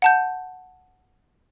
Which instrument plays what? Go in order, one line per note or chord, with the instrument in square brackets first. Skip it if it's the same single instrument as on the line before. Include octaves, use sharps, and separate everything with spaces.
[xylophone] F#5 A5 G6